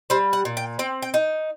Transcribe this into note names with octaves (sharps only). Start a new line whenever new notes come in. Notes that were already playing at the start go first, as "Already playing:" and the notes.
G3 C5
F#5
A#2
G5
C4 G5
G5
D#4